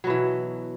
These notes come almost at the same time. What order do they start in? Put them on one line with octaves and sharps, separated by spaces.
F#3 B2 E3